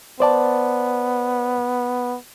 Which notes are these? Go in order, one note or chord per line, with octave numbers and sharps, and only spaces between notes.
B3 C5 D5 A5